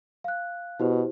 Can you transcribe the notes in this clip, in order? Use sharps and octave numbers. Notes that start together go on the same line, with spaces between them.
F5 F#6
B2 E4 G4 C5